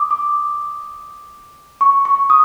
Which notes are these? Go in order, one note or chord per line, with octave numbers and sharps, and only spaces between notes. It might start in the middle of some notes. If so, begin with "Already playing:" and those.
Already playing: D6 D#6
D6
C#6
C#6
D#6